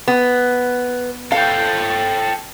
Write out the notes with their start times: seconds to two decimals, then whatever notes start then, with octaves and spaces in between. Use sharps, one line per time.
0.08 B3
1.32 A4 F5 G5